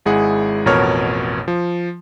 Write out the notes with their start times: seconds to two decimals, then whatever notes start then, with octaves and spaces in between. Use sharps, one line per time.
0.05 G#1 G#3 E4 G#4 F#5
0.66 A1 F2 B2 A#4 C#5 F6
1.48 F3